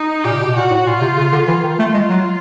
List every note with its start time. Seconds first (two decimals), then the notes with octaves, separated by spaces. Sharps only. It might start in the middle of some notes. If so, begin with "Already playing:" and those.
Already playing: D#4
0.24 A#2 G4
0.33 C3
0.40 B2
0.51 B2
0.56 A#2 F#4
0.71 A2
0.86 A#2 F4
1.01 C3
1.17 C#3
1.32 D3
1.48 E3 F4
1.63 D#3
1.79 A3
1.94 G#3
2.09 F#3